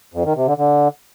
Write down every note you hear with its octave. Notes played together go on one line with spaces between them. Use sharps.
F2
D#3
C3
D3
D3